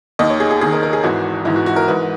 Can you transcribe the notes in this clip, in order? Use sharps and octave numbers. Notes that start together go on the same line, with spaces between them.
D#2 D#3 D#5
C#5
G#4
G#4
D#2 D#3 G#4
A#4
A#4
G#4
G#1 G#2 E3 F#4
G#1 G#2 E3 E4
F#4
F#4
A#4
G#2 E3 B4